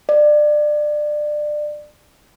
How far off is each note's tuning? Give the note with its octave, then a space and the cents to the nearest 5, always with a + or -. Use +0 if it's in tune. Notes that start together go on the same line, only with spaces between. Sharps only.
D5 +25